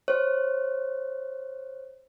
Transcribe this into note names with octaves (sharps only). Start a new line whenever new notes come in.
C5 C#5